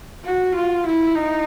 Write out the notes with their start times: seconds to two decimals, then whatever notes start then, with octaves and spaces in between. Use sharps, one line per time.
0.25 F#4
0.54 F4
0.85 E4
1.14 D#4